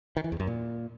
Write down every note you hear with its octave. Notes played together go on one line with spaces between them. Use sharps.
D#3
E3
E2
F#2
A#2